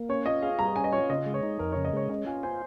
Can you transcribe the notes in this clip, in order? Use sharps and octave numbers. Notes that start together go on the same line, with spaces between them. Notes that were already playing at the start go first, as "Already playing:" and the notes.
Already playing: A#3
C#4 C#5
F4 D#5
G#4 F5
G3 A#5
C#4 G#5
D#5
F4 C#5
C#3 D#5
G#3
C#5
D#4
F2 A#4
C#3 C#5
D#5
G#3 C#5
C#4 D#5
F4 G#5
C5 G#5